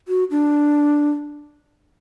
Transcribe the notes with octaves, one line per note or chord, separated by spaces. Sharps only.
F#4
D4